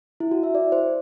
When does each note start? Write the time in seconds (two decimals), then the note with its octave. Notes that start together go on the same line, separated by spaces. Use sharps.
0.20 E4
0.31 F#4
0.43 E5
0.55 D5
0.72 C5